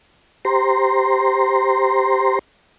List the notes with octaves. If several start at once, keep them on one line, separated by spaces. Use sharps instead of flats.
G4 C5 A#5 C6